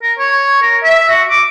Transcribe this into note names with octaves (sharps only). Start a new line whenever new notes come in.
A#4
C#5
A#4
E5
F#4
D6